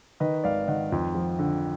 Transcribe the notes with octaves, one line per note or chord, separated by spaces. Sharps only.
D#3 B4 D#5
G#1 D5 F5
D#3 D#5 F#5
F2
F3
D3